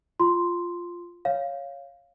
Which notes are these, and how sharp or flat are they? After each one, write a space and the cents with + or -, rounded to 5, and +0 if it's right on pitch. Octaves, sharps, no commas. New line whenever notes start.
F4 +0 C6 +0
C#5 +0 F5 +0